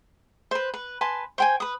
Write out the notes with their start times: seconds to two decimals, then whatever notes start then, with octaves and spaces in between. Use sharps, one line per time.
0.51 B4 C5
0.74 B4
1.01 B4 G#5 A5 C6
1.38 C5 G5 G#5
1.60 B4 D#6